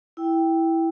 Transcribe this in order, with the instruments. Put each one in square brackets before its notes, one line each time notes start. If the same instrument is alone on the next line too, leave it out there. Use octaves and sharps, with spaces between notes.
[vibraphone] E4 G5